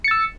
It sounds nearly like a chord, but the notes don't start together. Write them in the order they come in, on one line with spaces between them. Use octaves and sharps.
C#7 A6 E6